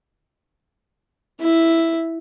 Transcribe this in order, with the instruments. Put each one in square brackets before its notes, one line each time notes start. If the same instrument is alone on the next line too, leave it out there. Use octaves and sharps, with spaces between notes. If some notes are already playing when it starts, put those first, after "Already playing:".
[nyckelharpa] E4